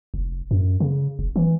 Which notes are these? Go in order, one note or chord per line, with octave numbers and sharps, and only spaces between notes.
F1
F#2
C#3
F1
E3